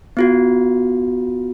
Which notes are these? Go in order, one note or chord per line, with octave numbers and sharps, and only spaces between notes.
B3 F4 F#4